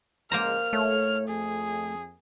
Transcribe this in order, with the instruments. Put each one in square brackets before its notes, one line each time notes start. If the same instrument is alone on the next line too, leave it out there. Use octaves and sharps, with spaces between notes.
[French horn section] A#2 C#3 G#3 [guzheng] A#3 C5 A#5 [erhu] F6
[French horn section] A2 C#5 [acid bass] A3
[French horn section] F2 [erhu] G#4